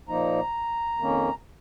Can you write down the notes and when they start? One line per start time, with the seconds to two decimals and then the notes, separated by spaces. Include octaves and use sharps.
0.08 A#2 F3 A#3 D#4 A#5
0.98 F2 D#3 A#3 C#4